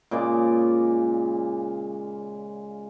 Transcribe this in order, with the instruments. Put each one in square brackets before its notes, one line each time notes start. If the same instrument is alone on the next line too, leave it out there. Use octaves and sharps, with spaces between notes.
[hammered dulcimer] A#2 C#3 G#3 D5